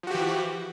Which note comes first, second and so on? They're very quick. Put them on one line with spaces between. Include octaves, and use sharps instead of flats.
F3 F#4 G4 E3